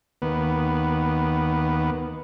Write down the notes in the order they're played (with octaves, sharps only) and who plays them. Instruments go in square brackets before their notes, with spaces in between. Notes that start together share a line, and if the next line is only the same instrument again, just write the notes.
[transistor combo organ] D#2 B3